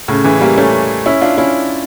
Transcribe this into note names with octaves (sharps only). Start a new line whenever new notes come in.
A2 C#3
C#3 E3
G3 A#3
A3 C#4
C#4 E4
D4 F4
C#4 E4